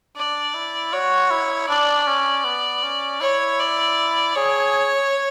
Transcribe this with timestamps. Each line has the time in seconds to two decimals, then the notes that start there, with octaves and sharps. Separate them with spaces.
0.16 D4 D5
0.54 E4
0.93 F#4 C#5
1.31 E4
1.69 D4 D5
2.07 C#4
2.45 B3
2.83 C#4
3.21 E4 C#5
3.59 D5
4.35 G#4 C#5